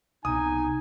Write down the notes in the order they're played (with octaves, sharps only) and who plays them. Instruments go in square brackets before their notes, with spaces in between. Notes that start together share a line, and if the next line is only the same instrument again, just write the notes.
[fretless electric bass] C2 B2 [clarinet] D#4 [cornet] G#5 [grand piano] D#6